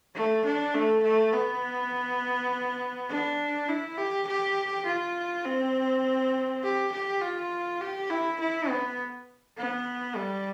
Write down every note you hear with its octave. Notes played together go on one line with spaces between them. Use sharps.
A3
D4
A3
A3
B3
D4
E4
G4
G4
F4
C4
G4
G4
F4
G4
E4
E4
B3
B3
G3